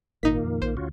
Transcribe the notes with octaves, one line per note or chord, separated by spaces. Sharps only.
G#1 A#2 D#3 A#3 D#4 B6
F2
A#1 C5
D2 C#4 F4 F#4